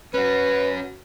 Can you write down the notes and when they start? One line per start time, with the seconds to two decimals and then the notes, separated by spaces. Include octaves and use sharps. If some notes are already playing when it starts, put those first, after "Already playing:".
0.14 C#4 F#4 B4